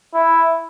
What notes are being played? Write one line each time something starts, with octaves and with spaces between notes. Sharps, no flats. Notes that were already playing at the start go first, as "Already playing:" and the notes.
E4